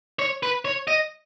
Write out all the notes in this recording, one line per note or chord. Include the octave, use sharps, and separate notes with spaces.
C#5
B4
C#5
D#5